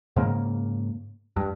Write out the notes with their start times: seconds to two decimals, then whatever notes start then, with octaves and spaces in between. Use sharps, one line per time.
0.16 G#2 C#3 A#3
1.37 G2